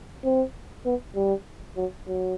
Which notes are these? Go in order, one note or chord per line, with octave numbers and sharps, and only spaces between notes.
C4
B3
G3
F#3
F#3